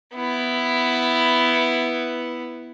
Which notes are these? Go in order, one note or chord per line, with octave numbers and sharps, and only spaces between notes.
B3 E4